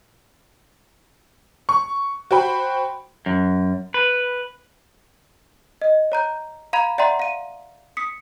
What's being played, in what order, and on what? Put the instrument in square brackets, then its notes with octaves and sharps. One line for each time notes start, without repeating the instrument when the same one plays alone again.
[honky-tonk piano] C#6
F#4 C5 G5 B5
[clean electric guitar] F#2
B4
[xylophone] D#5
C#5 A#5 G6
F5 A#5 B5 G#6 F7
D5 E5 F#5 G5 A#5 C6
F5 D#7
D#6 B6 C#7